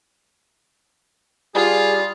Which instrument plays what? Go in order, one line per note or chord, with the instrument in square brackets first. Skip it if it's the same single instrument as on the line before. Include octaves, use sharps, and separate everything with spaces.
[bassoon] G3 [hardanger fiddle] F4 [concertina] G#4